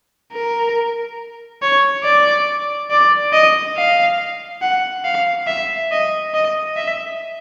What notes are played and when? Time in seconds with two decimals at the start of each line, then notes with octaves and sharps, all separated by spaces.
0.33 A#4
1.62 C#5
2.04 D5
2.91 D5
3.33 D#5
3.77 F5
4.62 F#5
5.05 F5
5.47 E5
5.91 D#5
6.34 D#5
6.76 E5